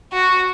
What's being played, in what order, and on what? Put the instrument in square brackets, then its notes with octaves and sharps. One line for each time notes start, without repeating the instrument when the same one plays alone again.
[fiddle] F#4